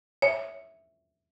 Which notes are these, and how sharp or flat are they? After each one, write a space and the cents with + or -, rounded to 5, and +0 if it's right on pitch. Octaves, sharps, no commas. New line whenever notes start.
C#5 +0 E5 -5